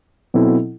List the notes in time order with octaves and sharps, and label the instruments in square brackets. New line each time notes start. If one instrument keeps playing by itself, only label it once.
[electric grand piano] B2 F#3 C4 E4 A4